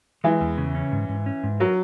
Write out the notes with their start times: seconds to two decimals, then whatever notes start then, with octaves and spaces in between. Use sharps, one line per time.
0.24 E3 G#3
0.41 E2
0.58 C#3
0.75 C#4
0.92 G#2
1.09 G#2
1.26 C#4
1.43 G#2
1.60 F#3 A#4